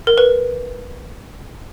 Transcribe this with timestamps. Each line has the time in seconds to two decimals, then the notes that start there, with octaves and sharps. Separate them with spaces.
0.07 A#4
0.18 B4